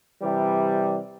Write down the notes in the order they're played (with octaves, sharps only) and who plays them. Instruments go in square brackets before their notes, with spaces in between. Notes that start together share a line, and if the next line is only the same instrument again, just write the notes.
[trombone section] C3 E3 G3